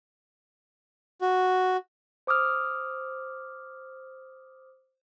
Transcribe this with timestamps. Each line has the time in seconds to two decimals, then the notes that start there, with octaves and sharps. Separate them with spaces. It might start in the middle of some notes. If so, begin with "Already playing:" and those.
1.21 F#4
2.27 C5 D6 D#6 F6